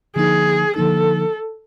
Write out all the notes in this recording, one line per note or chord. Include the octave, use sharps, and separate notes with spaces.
D3 F3 A#3 D#4 G#4
D3 F3 A#3 D#4 A4